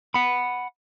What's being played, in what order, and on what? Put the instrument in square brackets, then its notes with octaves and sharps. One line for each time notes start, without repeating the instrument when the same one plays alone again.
[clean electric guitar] F#5 B5